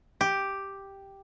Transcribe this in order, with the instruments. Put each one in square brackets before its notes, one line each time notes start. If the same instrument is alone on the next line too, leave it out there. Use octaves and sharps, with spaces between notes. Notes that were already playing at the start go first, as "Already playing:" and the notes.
[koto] G4